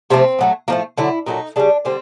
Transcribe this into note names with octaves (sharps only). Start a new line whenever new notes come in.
C3 F3 A3 C4
A2 F#3 A3
A2 F3 A3 A#3
D3 F#3 A3 E4
A#2 F#3 A3 D#4
C#3 E3 G3 D4
D3 G3 C4